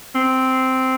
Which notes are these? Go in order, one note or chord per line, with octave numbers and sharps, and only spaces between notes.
C4